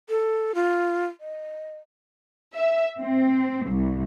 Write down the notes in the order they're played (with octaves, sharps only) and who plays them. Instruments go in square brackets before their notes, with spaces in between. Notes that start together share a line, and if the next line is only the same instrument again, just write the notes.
[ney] A4
F4
D#5
[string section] E5
C4
C2